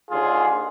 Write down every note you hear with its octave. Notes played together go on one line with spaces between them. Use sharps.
D#2 D3 F4 G#4